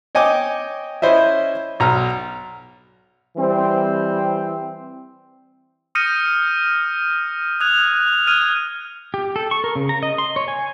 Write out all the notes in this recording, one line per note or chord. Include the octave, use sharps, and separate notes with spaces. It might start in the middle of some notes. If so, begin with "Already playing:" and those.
C#5 D#5 G5 G#5 D6
C#4 E4 C5 D#5 E5
B1 A#5 F6
E3 G3 C4
D#6 F6 G6 A#6 C#7 D#7
D#6 F#6 G#6 F7
D#6 F6 F#6 G#6 D#7
G4
A4
C#6
A#4
C#3
A#5
D#5
C6
C#5
G#5